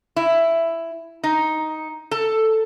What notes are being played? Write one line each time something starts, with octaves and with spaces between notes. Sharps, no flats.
E4
D#4
A4